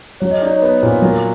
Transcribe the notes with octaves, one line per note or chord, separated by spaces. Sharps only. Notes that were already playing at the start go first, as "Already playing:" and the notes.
F#3 C#5
D#5
D#4 D5
C#5
B3 C#5
A#2 C5
F#3 A#4